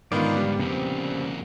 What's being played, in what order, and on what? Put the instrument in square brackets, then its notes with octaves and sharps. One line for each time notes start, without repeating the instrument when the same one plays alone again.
[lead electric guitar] G#2 D3 [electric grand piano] D#3 B3 F4 [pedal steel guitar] D5 F5 B5
[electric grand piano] G3 B3
[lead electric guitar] F2 A#3 [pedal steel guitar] C#3 C4